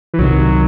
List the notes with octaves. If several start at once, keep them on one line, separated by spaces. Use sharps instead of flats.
E3
C2 C3 D#3 F#3